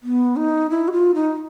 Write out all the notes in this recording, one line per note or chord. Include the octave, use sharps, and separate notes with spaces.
B3
D#4
E4
F#4
F4
D#4